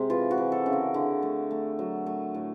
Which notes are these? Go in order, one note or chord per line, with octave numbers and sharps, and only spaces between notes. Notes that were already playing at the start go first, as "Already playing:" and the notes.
Already playing: C3 G#3
E3 F4
F#4
E3
A4
C#3
A#4
D3
A3
A3
F#3
A3
A2